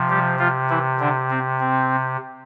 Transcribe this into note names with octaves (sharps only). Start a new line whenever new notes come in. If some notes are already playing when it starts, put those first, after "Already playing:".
Already playing: C3 F3
G3 G4
F3 F4
E3 E4
D3 D4
C4
C4